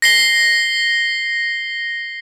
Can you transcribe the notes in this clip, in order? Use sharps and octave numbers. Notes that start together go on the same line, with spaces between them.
A#6 C7 G7